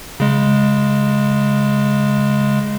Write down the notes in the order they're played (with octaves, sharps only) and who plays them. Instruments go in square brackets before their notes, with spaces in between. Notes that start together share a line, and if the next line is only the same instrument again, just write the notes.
[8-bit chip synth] C#3 G#3